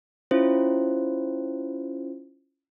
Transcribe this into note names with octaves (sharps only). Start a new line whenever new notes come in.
C#4 E4 F4 C5